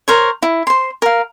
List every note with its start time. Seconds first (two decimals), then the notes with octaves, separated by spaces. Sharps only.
0.08 A#4 C5 C#5
0.43 E4
0.67 C5 C6
1.02 A#4 F5